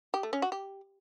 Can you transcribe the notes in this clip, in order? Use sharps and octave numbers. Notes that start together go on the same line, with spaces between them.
G4
A3
C#4
F#4
G4